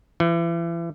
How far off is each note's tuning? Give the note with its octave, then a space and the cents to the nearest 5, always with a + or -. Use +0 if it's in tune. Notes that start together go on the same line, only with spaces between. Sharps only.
E3 +35